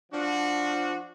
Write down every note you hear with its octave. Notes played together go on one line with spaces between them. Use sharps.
F3 D4 F#4